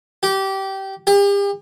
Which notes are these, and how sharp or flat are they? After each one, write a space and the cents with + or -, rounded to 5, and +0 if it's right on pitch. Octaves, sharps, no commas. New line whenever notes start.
G4 -20
G4 +40